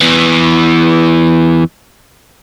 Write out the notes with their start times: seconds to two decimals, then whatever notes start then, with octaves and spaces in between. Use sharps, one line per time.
0.01 E2 E3